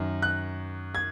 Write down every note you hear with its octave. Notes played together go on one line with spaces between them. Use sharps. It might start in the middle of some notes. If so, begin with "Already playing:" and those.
Already playing: F#2 D#3
F#6
G#6